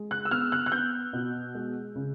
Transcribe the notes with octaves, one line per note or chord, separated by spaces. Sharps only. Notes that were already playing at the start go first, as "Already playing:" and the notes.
Already playing: G#3
F#6
E6
B3 F6
F#6
F#6
B3 G6
B2
G#3
C#3